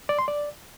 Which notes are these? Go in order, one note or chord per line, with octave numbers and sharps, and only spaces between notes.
D5
C6
D5